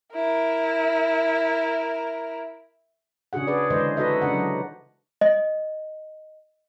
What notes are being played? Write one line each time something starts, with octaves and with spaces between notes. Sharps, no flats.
E4 A#4
C#3 D4 F#4 G#4 F#5
G#4 B4 D5
D3 E3 G#3 C5 D5 D#5
D#4 F#4 A4 B4 D#5 E5
C#3 D4 F#5
F#3
D#5